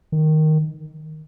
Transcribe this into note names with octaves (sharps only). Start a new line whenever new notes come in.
D#3